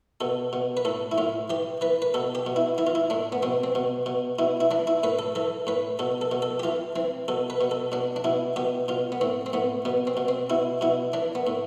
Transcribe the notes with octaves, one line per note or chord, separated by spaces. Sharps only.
B2 A4
B2
B4
A2 A4
E4
A2 F4
E3 G4
E3 B4
B4
B2 A4
G4
B2
E4
E3 E4
F4
E4
A2 D4
B3
B2 C4
C4
B2
B2
B2 E4
E4
E3 D4
E4
A2 B4
A4
E3 A4
A2 B4
B2 A4
A4
B2
A4
G4
E3 F4
E3 C4
B2 A4
B4
B2
A4
B2 D4
D4
B2 E4
B2 G4
B2 F4
B3
A2 C4
C4
A2 B3
B2 B3
C4
B2
C4
B2 E4
B2 E4
E3 D4
B3
A2